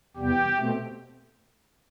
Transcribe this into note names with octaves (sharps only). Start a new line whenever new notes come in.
E2 C3 G3 B3 G4
B2 A3 C4